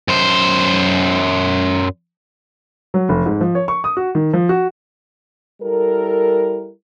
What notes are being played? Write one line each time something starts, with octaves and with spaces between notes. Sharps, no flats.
F#2 C5
F#3
F1
G#2
F3
C#5
C#6
D#6
F#4
D#3
F3
F#4
G3 E4 A4 A#4